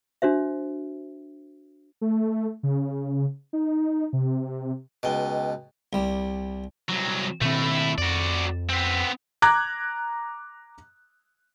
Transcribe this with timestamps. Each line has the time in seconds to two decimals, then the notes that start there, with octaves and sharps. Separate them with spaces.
0.22 D4 F#4 C5 E5
2.01 A3
2.63 C#3
3.53 D#4
4.13 C3
5.03 C#2 B2 D#5 G5
5.93 C2 G3
6.89 C2 F#3
7.41 B2 D#3 A3 C4 E4
7.98 F2 F#4 D5
8.69 B3 C4
9.42 A#5 D6 F#6 G#6